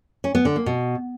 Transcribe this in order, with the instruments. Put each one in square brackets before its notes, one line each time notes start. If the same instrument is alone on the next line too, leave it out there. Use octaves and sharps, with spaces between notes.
[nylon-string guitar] C#4
B3
D3
A#3
B2